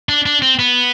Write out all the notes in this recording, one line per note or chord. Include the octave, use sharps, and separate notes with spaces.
D4
D4
C4
B3